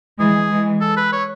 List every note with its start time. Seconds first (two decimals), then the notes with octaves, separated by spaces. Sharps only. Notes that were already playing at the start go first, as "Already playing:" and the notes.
0.18 E3 G#3 G#4
0.50 E3 G#3
0.81 A4
0.97 B4
1.12 C#5